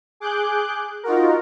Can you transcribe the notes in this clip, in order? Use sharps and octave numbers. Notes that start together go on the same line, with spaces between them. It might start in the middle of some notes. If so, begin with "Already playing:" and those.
G#4 D6 F#6 G6
D#4 F4 F#4 A#4